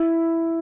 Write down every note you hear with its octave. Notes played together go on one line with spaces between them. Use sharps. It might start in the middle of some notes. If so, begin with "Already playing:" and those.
Already playing: E4